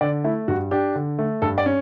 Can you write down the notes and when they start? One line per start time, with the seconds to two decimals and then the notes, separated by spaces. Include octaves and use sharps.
0.01 D3 D5
0.24 A3 E4
0.48 G2 F#4
0.71 D4 G4
0.95 D3
1.19 A3
1.42 G2 A4
1.58 D5
1.66 C#4